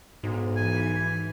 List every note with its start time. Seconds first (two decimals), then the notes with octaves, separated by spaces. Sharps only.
0.23 B1 G#2
0.57 E3 G#5